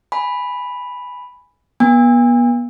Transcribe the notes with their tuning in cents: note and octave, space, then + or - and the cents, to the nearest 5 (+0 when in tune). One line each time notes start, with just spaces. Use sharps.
G#5 +0 B5 +0
B3 -35 G#5 -45